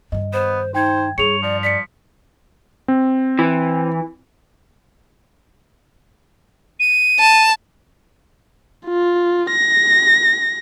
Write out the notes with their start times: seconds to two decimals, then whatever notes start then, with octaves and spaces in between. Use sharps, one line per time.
0.12 G2 D#3 D#5
0.33 B3 C5
0.74 D#4 C5 G5 G#6
1.18 G2 G#4 C#5 C#7 F7
1.42 F3 D5
1.63 D5 B6 C#7
2.88 C4
3.39 E3
6.80 D#7
7.19 A5
8.86 F4
9.50 A#6